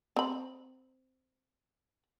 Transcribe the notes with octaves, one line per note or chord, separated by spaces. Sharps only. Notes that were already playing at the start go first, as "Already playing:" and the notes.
C4 B5